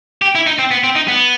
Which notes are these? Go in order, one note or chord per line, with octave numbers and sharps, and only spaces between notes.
G4
E4
D#4
C4
B3
C4
D#4
B3